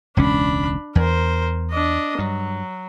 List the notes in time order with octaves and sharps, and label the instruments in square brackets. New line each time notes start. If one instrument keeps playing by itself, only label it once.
[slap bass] E1 C#2 C#4 [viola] D4 B5
[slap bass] E2 [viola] A#4 C5
[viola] D4 D#5
[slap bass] G2 [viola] F#3